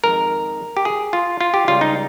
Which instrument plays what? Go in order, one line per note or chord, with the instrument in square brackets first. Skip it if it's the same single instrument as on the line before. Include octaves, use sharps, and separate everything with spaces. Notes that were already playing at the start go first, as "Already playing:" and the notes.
[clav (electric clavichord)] F2 D#3 G#3 A#4
G4
G#4
F4
F4
G4
C#2 C#3 G3 F4
D#4